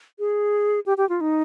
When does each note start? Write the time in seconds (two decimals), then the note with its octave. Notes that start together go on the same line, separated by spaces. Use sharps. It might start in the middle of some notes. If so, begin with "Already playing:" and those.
0.19 G#4
0.86 G4
0.98 G4
1.09 F4
1.21 D#4